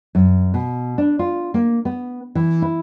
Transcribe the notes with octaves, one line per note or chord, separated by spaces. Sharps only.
F#2
B2
D4
F4
A#3
B3
E3
E4